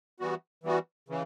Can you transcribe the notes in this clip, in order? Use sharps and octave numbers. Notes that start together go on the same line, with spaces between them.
E3 G3 B3 F#4
E3 G3 B3 F#4
C#3 E3